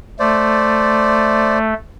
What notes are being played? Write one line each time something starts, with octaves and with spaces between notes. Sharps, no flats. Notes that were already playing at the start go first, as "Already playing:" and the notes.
A3 C5 D5